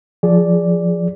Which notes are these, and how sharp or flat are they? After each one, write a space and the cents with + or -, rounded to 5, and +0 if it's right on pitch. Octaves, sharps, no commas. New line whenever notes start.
F3 +0 G#4 +0 D5 -5